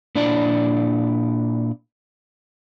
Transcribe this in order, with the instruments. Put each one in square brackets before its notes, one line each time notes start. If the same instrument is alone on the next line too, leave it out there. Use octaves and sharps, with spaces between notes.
[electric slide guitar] A#2 D4 E4 D5